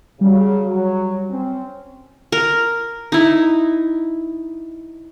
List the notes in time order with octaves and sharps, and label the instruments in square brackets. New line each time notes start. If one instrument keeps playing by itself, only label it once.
[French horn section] C#3 F#3 [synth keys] G3
[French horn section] F#3
C4 C#4
[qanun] A#4
D#4 E4